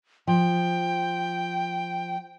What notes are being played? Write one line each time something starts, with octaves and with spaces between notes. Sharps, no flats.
F3 G5